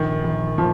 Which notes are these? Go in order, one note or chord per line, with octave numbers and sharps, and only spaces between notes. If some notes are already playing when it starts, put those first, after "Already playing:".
Already playing: A#1 D#3
A#1
A#2 F3